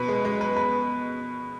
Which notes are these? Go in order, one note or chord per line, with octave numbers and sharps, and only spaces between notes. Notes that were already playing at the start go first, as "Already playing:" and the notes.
Already playing: B2 B4
G#3
G#3
B4
B4